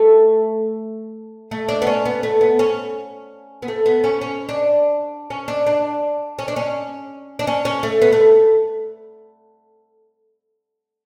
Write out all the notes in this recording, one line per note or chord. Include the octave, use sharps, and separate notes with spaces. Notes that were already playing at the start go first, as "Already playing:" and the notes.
Already playing: A3
A3
D4
B3
C#4
B3
A3
B3
C#4
B3
A3
B3
C#4
C#4
D4
C#4
D4
D4
C#4
D4
C#4
D4
C#4
C#4
A3
B3
A3